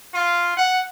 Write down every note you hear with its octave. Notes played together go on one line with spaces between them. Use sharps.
F4
F#5